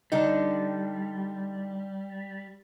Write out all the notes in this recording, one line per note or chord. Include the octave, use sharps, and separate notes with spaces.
D3 G3 D4 D#4